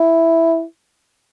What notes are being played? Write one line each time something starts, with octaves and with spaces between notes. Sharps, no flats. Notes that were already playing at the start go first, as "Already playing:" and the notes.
Already playing: E4